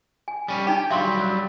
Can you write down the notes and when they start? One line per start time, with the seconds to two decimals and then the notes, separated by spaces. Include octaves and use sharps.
0.28 G#5
0.48 G3 C#4
0.67 D4 D#4 G4 G5
0.90 F#3 G3 E5 F5 C6